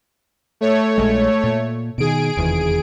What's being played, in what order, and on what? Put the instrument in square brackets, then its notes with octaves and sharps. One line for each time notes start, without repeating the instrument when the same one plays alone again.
[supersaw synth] A3 C#5
[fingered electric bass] A#1 E2 G#3
A#2
[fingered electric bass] B2 D#3 [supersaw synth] G#4 D7
[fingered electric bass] F1 E2 D#3